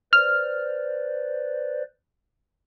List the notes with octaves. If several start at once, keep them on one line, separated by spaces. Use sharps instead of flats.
B4 C5 D5 F6